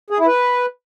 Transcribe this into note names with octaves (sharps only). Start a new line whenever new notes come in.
G#4
E4
B4